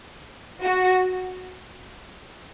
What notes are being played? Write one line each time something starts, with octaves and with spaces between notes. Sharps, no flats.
F#4